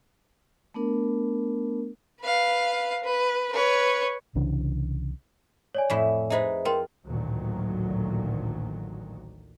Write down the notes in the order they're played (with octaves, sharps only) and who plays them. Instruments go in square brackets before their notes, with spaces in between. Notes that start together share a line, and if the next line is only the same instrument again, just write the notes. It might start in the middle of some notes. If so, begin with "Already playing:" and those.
[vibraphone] A3 B3 D4 A#4
[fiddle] B4 F5
B4
B4 C#5
[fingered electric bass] C2 C#3 E3 D4
[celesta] C#5 D5 G#5
[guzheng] F2 A2 E4
[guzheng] D#4 G#4 B4 [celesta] C5 D#5 E5
[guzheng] F4 [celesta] A#4 G5 C6
[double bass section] A1 D2 A#2 D#3 F#3